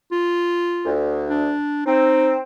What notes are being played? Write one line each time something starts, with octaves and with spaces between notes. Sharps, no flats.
F4
D2
D4
C4 D#4